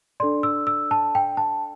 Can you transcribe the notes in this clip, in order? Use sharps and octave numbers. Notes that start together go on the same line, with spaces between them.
D4 A4 D5 C6
E6
E6
A5
G5
A5